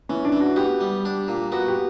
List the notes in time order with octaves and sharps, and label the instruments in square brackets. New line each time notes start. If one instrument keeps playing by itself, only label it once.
[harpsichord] E3 [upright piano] C#4
[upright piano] D4
[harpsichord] E3
[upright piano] F#4
[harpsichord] B3 [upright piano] G4
[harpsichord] G3
D4
A#2
[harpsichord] B3 [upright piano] F#4
[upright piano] G4